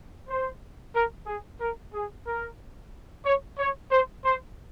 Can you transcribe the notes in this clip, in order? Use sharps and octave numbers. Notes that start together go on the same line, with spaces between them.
C5
A#4
G#4
A#4
G#4
A#4
C#5
C#5
C5
C5